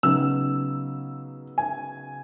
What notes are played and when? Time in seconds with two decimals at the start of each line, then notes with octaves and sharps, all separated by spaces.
0.03 C#3 F#3 B3 D#4 E6
1.58 G#5